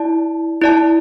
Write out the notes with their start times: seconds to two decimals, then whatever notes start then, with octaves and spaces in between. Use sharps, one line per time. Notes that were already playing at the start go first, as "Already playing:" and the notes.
Already playing: E4 D5 A5
0.61 E4 D5 A5